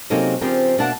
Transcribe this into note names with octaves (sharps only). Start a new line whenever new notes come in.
C3 F#3 A#3 C#4 D#4 A4
C#3 F3 C4 D4 G4 A#4
B2 A#3 D4 E5 F#5 A5